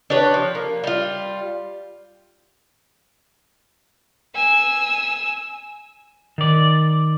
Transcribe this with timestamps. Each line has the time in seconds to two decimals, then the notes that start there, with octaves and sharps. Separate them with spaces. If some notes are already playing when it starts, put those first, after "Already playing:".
0.10 D4 G4 B4 C#5
0.34 F3
0.55 A#3
0.84 G3 F4
4.35 G#5 E6
6.38 D#3 D5